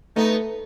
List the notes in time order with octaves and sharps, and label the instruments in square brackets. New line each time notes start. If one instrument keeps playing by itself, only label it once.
[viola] A3 [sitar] B3 D#4